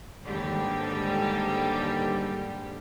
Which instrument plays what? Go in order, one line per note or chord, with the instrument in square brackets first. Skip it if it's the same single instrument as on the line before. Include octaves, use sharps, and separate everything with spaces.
[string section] D#2 G#2 D3 G3 G4